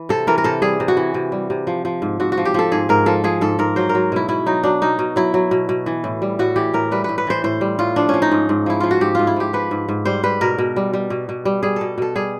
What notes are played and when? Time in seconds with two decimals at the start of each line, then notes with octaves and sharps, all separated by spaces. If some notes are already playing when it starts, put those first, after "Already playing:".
Already playing: E3
0.09 C3 A4
0.27 E3 A#4
0.38 A#4
0.44 C3 A4
0.62 G3 G#4
0.80 C3
0.88 F#4
0.97 E3
1.14 C3
1.32 G3
1.50 C3
1.67 F3
1.85 F3
2.02 G#2
2.20 G#2 F#4
2.32 F#4
2.37 F3
2.45 G4
2.54 F3 A4
2.72 G#2 G#4
2.89 G#2 A#4
3.06 F3 A4
3.24 F3 G#4
3.41 G#2 A4
3.59 G#2 A#4
3.76 F#3 C5
3.89 A#4
3.95 F#3
4.12 B2 E4
4.28 B2 E4
4.47 F#3 D#4
4.63 F#3 D4
4.82 B2 D#4
4.99 B2
5.16 F#3 E4
5.34 F#3
5.51 B2
5.69 B2
5.86 E3
6.04 A2
6.22 G3
6.39 A2 F#4
6.56 E3 G4
6.74 A2 A#4
6.91 G3 B4
7.04 A2 B4
7.18 B4
7.27 E3 C5
7.44 A2 C5
7.61 G3
7.79 A2 F4
7.96 F3 D4
8.09 F3 C#4
8.22 D#4
8.32 G#2
8.49 G#2
8.66 F3 E4
8.80 F3 F4
8.91 F#4
9.01 G#2 G4
9.15 G#2 F4
9.27 E4
9.36 F3 G4
9.53 F3 B4
9.71 G#2
9.89 G#2
10.05 G3 C5
10.23 G3 B4
10.41 B2 A#4
10.58 B2
10.76 G3
10.93 G3
11.10 B2
11.29 B2
11.45 G3
11.63 G3 G#4
11.76 B2 A4
11.98 B2 A4
12.15 G3 G#4